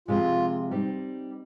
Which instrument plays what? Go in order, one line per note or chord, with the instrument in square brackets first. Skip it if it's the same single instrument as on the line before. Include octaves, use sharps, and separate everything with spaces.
[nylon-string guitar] C3 F3 G#3 [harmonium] F4
[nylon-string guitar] G3 C4 D#4